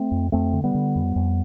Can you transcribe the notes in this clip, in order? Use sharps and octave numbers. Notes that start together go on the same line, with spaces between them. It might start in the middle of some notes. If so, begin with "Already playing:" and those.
Already playing: A3 C4
F2
F2 A3 C4
D3
G3 B3
D3
F2
F2